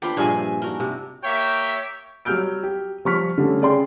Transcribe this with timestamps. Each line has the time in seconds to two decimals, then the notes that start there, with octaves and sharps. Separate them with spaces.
0.02 D4 F4 G4 B4 C5 B5
0.17 G2 A#2 F3 D4 G#4 D#5 E5 G#5
0.62 D4 D#4 F#4 A#4
0.80 C3
1.23 A#3 G4 C#5 E5 G5
2.25 F#3 G3 E6 F6 G6 D7
2.63 G4
3.05 F3 G3 C#6 F6 B6
3.38 D3 G3 A3 C#4
3.61 C#3 G#4 D5 G5 C6